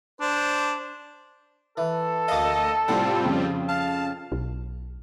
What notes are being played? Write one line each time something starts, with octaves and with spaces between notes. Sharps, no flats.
D4 C5
E3 A4
D2 A#3 D#5 F5
A2 C3 G3 C4 F4 F#5
F2 C#3
F5 A5
B1